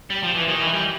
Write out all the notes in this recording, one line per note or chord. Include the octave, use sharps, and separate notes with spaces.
G3
F3
E3
D#3
E3
G3